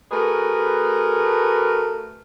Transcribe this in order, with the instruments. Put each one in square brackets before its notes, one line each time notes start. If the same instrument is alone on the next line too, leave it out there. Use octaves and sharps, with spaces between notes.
[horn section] A3 F#4 G#4 A#4 B4